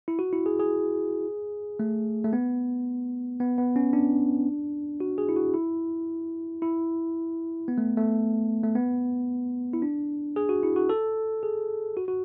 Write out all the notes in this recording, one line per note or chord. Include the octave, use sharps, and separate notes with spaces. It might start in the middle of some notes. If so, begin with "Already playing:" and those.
E4
F#4
E4
G#4
G#4
A3
A3
B3
B3
B3
C#4
D4
F#4
G#4
E4
F#4
E4
E4
B3
A3
A3
A3
B3
E4
D4
G#4
F#4
E4
F#4
A4
G#4
F#4
F#4